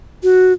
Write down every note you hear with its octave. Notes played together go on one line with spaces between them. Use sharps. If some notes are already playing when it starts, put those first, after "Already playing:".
F#4